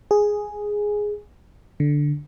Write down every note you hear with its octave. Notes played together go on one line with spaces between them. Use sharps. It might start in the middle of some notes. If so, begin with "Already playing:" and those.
G#4
D3